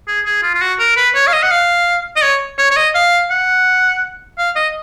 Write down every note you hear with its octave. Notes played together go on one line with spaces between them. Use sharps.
G#4
G#4
F4
F4
F#4
A#4
B4
C#5
F5
D#5
F#5
F5
D#5
C#5
C#5
C#5
D#5
F5
F#5
F5
D#5